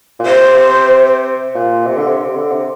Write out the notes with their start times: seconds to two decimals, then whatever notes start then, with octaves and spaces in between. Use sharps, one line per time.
0.19 A#2
0.26 C3 C5
1.55 A#2
1.87 C3
1.97 D3
2.06 C3
2.25 C3
2.35 D3
2.51 C3